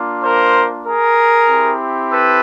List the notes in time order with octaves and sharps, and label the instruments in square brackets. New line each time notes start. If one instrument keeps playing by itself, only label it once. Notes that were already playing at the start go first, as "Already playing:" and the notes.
Already playing: [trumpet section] A#3 D4 F4
A#4 C5
G#4 A#4
C4 E4 G4
A4 B4